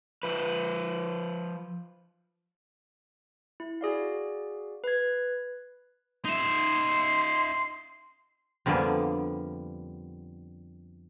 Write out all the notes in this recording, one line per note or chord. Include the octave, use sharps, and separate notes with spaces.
F3 B4
E4
F#4 G#4 D5 F5
B4 G#6
D#4 E5 C6
F2 D3 G3 A#3 B3 G#5